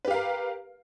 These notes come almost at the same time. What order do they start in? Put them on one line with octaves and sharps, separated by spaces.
B4 G4 F5 A#4